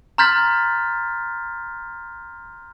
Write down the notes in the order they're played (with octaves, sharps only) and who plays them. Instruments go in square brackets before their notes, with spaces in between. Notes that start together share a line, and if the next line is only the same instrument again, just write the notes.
[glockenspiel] A#5 C6 F6 G6 A6 B6